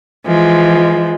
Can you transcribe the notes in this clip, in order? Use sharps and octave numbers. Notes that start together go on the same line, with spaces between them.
E3 F3 G#3